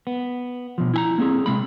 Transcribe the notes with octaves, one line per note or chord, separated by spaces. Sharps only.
B3
B2 F3
E4 G#5 A#5
A#3 C4 G#4
C3 G#3 B5